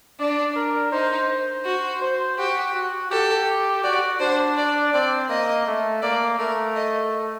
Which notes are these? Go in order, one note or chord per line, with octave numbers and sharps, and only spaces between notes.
D4 D5
A#4
D#4 C5
C5
F#4
C5
F#4 G4
F#4
G4 A4
F#4 D5
D4 C5
D5
C4 D5
A#3 D#5
A3
A#3 D5
A3 A#4
D#5